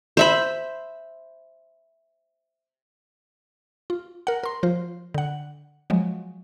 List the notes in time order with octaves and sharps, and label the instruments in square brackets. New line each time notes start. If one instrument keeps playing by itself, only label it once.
[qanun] C5 E5 B5
[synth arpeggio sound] F4
A#4 F#5
A#4 C6
F3 F4 C5
D3 F#5
F3 F#3 G#3